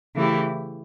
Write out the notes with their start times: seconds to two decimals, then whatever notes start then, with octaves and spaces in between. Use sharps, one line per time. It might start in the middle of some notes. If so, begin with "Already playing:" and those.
0.15 C#3 E3 A3 E4 G4